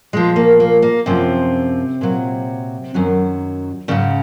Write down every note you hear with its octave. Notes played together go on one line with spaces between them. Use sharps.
A#2 F3 G#3
A#3
A#3
A#3
F#2 C3 F3 C4
A#2 F#3
F#2 D#3 F#3
G#2 C#3 F#3 C#4